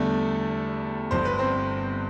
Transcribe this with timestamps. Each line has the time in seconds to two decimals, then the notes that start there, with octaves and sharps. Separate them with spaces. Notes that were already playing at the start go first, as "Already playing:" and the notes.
Already playing: E2 D3 G3 A3 A4
1.11 G1 G2 D3 C5
1.25 B4
1.39 C4 C5